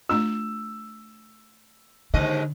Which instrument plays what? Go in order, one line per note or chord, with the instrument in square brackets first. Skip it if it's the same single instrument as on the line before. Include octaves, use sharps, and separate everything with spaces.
[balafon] A3 D4 F4 [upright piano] E6
[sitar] D#2 G#2 D#5 [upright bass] D3